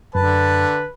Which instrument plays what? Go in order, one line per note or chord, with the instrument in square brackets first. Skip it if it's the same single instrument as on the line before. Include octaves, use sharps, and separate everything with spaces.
[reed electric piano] F#2 [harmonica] D3 A5 [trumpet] B4